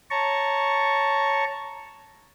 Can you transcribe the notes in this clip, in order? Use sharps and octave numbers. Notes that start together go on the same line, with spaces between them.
C#5 A5 A#5 C#6